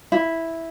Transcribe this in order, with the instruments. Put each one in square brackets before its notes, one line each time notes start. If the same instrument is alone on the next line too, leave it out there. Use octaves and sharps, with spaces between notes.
[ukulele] E4